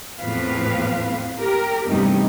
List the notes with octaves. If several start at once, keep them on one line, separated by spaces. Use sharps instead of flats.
E2 A2 F3 C4 B4 F5
G4 A#4
E2 G2 C3 G3 A3 D#4